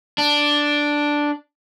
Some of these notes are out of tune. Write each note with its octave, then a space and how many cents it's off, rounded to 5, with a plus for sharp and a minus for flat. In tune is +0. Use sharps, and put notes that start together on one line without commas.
D4 +0